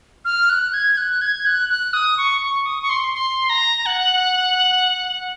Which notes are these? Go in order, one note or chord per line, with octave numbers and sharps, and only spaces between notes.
F6
F#6
G#6
G#6
F#6
G#6
F#6
F#6
D#6
C#6
C#6
D#6
C#6
C6
C6
A#5
F#5